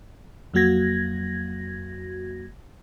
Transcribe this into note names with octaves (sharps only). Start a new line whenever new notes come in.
F2 F#3 A#3 F#4 G#6 A#6